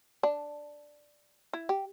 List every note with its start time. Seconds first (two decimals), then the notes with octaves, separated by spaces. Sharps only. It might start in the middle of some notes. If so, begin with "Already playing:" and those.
0.23 D4
1.53 E4
1.69 G4